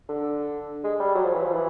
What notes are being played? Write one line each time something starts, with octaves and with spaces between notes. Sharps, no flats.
D3
G#3
G3
F#3
F3
E3
F3
E3